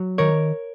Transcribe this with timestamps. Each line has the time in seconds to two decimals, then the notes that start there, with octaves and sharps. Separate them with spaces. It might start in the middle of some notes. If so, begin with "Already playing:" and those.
Already playing: F#3
0.18 D#3 A#4 C#5